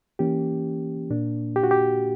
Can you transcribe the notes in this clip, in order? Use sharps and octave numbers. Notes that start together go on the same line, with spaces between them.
E3 A#3 C#4 G4
A#2 A#3 D4
G4
F#4
G4